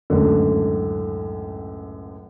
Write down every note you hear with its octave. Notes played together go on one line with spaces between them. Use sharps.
C#2 F#2 A2 D3